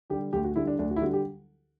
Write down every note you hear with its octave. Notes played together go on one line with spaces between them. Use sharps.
D3 G3 G4
D2 G4
F#4
D3 G3 E4
D4
D2 D4
F#4
E4
D3 G3 F#4
G4